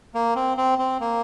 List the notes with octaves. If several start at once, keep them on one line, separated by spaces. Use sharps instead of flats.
A#3
C4
C4
C4
A#3